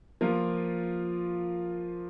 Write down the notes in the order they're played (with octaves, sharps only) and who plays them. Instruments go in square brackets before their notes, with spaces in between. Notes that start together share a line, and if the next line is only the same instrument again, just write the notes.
[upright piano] F3 A#3 F4 A#4